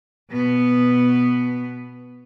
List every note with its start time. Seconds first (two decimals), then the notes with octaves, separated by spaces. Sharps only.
0.31 B2 B3